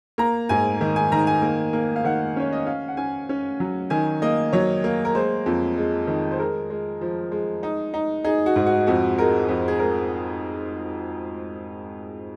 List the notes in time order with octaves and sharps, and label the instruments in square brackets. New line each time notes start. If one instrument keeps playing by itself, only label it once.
[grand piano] A#3 A#5
G#2 G#5
D#3
G#5
D#3 A#5
G#5
A#3
A#3
F5
D#3 F#5
C#4 C#5
D#5
C#4 F5
F#5
C#4 G#5
C#4
F#3
D#3 G#5
A#3 D#5
F#3 C#5
A#3
A#4
G#3 C5
F2
G#3
D#3
C5
G#3 A#4
G#3
F3
G#3
D#4
D#4
D#4 G#4
F#4
G#2
F#4
F2 F#4
G#3 A#4
F2
G#4
G#3 A#4